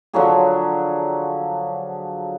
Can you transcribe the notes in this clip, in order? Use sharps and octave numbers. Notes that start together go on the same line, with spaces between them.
D3 F3 F#3 G#4